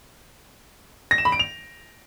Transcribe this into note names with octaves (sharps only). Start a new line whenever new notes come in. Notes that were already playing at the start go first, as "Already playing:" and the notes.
A#6
E7
B5
D7
F7